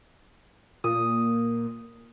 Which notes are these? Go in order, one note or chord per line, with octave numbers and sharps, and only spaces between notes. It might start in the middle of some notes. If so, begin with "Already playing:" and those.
A#2 D#6